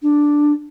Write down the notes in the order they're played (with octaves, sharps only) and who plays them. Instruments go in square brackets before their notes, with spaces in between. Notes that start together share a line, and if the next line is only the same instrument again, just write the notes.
[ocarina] D4